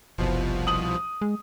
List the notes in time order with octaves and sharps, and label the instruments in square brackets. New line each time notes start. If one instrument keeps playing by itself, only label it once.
[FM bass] F#1 [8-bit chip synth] C2 B2 F3
[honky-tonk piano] D#6 F#7
[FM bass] G#3